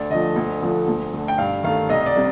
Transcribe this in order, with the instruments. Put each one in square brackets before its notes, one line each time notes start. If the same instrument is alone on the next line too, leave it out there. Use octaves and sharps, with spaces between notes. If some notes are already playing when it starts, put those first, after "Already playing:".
Already playing: [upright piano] D2 D5
D3 F3 A3 D#5
D2
D3 F3 A3
D2
D3 A3
G5
G2 F5
D#3 A3 F5
C2 D#5
D5
C3 G3